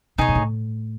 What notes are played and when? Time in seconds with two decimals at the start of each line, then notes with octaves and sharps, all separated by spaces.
0.18 B2 D#4 G#4 C#5
0.29 G#2
0.35 A2